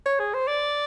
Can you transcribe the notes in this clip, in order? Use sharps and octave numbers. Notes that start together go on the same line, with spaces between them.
C#5
G#4
C5
D5